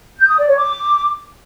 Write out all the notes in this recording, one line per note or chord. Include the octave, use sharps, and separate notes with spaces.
G6
D#6
D5
C#5
D6